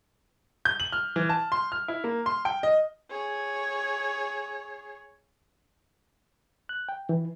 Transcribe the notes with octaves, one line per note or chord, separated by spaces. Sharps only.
G6
F#7
F6
E3
A5
C6
F6
E4
A#3
C6
G5
D#5
G#4 C#5
F#6
G5
E3